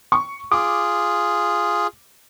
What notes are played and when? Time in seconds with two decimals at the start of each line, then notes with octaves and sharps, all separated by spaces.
0.12 C#6
0.52 F4 G#4 D6